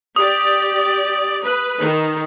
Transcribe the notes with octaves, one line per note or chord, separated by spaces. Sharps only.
G4 D5 D#6
B4
D#3